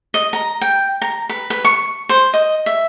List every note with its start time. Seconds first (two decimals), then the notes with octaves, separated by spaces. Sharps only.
0.14 D#5
0.33 A#5
0.61 G5
1.02 A#5
1.29 B4
1.50 B4
1.65 C#6
2.09 C5
2.34 D#5
2.66 E5